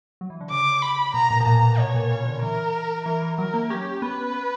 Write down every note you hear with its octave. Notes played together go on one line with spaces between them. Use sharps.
F#3
E3
D3
C#3 D6
B5
B2 A#5
A#2
B2
A#2 A#5
A#2
B2 C#5
A#2
C#3
D3
E3 A#4
E3 A#4
E3
F#3 A#4
A#3
C#4 G4
C#4
B3 B4
B3